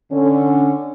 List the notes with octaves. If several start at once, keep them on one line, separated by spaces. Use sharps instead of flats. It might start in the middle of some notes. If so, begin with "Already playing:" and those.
D3 C#4